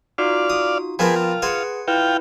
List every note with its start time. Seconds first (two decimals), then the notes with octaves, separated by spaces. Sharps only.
0.18 D#4 F4 F#4 D5 F5
0.50 D#6
0.99 F3 B3 C4 G#4 A#4 B4 G5 A5
1.16 F4
1.42 G#4 B4 F#5 G#5 C6
1.88 E4 F4 B4 G5